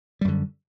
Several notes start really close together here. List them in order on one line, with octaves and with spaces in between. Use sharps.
G3 F#2 D3